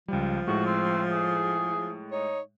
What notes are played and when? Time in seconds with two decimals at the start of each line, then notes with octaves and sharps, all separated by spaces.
0.08 C#2 F3 G3
0.47 A2 G#3 F#4
0.66 C4
1.11 G#4
2.12 D#4 C#5